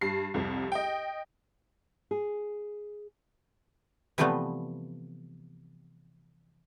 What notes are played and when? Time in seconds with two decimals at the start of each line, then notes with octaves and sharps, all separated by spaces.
0.01 G2 C7
0.34 C2 F2 G3
0.72 D#5 G5
2.11 G#4
4.18 C3 E3 F3 G3 A3 B3